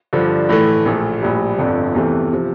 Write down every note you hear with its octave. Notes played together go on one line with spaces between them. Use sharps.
G2 D3 F3
A2 E3 A3
A#1 A#2 A3
A#1 A2 G3
G1 F2 D3
E2 C3 E3 A3
C3 F3